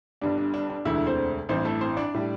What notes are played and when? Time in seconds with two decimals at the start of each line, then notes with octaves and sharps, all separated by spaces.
0.21 G1 G2 G3 D4
0.38 D4
0.54 D4
0.70 D4
0.85 E1 D2 D3 E3 E4
1.07 C4 C5
1.49 A1 G2 E3 C4 C5
1.65 A3 A4
1.81 C4 C5
1.97 D4 D5
2.14 A2 G3